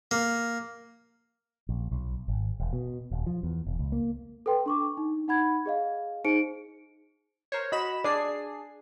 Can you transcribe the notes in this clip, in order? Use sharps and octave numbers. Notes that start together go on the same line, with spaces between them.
A#3
A#1
B1
G#1
E1
B2
D#1
F3
E2
E1
C#2
A#3
A4 B4 G5 C6
D4 C#6 D6
D#4
D#4 F#5 B5 G#6
G#4 D#5 F5
D#4 G#4 C5 C#7 D7
A#4 C5 C#5
F#4 D#5 B5 E7
D4 G#4 D5 C7